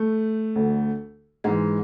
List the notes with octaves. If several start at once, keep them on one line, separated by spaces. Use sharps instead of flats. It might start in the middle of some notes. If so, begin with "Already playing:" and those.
Already playing: A3
D2 D3
G#2 E3 G#3